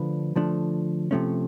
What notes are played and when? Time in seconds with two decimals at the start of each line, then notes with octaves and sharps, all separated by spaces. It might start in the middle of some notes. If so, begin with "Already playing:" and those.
Already playing: D3 F3 A3 D4 B4
0.36 D3 F3 A3 D4
1.11 C3 F3 A3 C#4